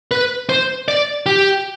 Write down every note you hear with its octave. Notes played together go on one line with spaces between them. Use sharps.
B4
C5
D5
G4